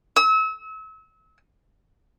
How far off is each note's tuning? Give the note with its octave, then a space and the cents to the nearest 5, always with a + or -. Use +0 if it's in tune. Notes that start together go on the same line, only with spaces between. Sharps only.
E6 -35